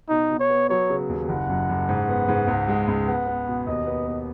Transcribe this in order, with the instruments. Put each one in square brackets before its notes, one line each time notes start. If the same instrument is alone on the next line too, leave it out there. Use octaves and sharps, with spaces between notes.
[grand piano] B2 [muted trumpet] D#4
[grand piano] B2
[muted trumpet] C#5
[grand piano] B3
[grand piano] F#3 [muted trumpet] C#5
[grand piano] C#3
D#2
[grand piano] F#1 [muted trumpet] F#5
[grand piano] F#2
F#1
G#2
B3
G#2
C#2
G#3
C#2
[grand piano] B3 [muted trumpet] F#5
[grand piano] B3
B2
[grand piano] D#2 [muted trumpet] D#5
[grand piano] B3
B3